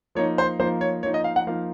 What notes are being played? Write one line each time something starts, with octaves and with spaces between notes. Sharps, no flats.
F3 A#3 D#4 C#5
C5
F3 A#3 D#4 C5
C#5
F3 A#3 D#4 C#5
D#5
F5
F#5
F3 A#3 D#4 F5